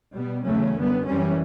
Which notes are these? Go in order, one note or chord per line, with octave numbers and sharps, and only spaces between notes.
B2 G3 B3
E2 C#3 F#3 A3 C#4
F#2 D3 G3 B3
F#2 E3 G3 C#4